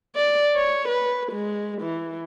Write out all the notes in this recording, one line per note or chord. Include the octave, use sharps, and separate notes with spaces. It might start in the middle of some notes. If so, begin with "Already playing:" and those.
D5
C#5
B4
G#3
E3